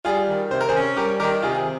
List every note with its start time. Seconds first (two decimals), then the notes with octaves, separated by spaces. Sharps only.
0.05 G3 F4 G#4
0.28 D#3
0.51 C3 C5
0.61 A#4
0.69 G#4 C5
0.75 C#4
0.96 G3 G4 A#4
1.20 D#3 G4 A#4
1.42 C3 F4 G#4
1.55 G#4